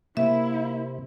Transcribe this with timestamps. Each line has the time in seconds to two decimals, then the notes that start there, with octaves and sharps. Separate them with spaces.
0.17 C3 A#3 E4 E5